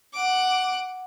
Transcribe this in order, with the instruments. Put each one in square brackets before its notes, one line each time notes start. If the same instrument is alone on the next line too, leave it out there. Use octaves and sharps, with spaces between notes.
[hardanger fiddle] F#5 D6